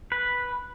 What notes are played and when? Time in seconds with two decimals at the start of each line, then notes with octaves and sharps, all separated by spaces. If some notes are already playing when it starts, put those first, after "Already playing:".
0.12 B4